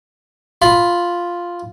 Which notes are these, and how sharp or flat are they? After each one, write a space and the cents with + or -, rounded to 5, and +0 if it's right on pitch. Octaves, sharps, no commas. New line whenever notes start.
F4 +0 B5 +0